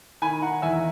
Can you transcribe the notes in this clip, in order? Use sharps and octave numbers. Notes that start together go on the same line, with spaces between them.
D#3 G#5 B5
D#3 F#5 A#5
E2 E5 G#5